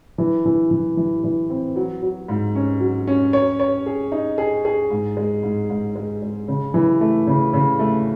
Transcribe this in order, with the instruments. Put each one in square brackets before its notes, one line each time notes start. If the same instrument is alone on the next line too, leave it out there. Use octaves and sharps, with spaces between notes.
[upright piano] E3
E3
E3
E3
E3
C4
F#3
F#3
G#2
C#4
F#3
C#4
C#5
C#5
G#4
D#4
G#4
G#4
G#2
G#3
G#2
G#2
G#3
G#3
C#3
E3
A3
C#3
C#3
A3